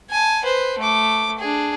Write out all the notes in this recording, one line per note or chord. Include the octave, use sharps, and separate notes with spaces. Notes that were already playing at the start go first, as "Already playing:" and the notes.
G#5 A5
B4 C5
A3 D6
D4 G#4